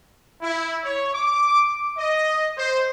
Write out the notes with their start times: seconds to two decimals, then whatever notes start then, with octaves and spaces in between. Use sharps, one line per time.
0.42 E4
0.84 C#5
1.14 D6
1.98 D#5
2.57 C5